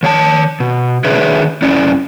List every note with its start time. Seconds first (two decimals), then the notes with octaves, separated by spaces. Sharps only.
0.03 D#3 C#5 F5 A5
0.60 B2
1.05 D#3 D4 G#4 B4 C#5 E5
1.62 F#2 C#4 E4 D5